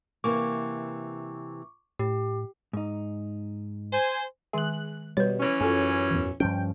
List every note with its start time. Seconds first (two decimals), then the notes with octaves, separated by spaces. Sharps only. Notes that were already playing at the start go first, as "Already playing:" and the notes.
0.24 C3 E3 A#3 C#6 D6
1.99 A2 G4
2.73 G#2 D#4
3.92 C5 G#5
4.53 D#3 G#3 G#4 F#6
5.17 B2 G3 B4 C#5
5.40 E3 C#4
5.61 F#2 F4 A4 G#5
6.11 A1 E2
6.40 G2 F3 C#4 G5